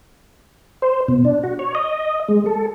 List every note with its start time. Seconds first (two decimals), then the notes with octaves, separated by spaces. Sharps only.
0.82 C5
1.08 B2
1.25 D4
1.43 F#4
1.59 C#5
1.75 D#5
2.28 G#3
2.46 A4